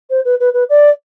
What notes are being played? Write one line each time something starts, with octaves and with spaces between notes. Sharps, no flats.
C5
B4
B4
B4
D5